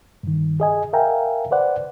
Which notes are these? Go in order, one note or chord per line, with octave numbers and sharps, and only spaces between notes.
G2 D#3
G#4 D#5 G#5
A#4 E5 F5 G5 G#5 A#5
B4 C5 D5 F#5